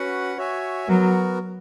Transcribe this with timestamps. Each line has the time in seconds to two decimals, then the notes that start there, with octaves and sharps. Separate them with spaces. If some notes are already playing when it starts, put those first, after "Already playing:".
Already playing: C#4 F#4 B4 F#5
0.37 F#4 C#5 E5 G#5
0.88 F#3 B3 F#4 A#4